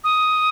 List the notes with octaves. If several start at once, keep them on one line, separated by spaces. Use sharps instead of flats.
D#6